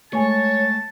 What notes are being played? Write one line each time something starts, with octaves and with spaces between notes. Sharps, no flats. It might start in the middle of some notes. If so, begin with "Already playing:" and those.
G#3 A3 C#5 G#5 A5 C#6